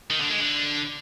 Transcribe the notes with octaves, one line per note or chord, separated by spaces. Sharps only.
D#3
D3
G#3
D3